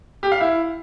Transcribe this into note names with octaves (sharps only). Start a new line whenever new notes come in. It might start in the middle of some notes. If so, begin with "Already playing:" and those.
G4
F5
E4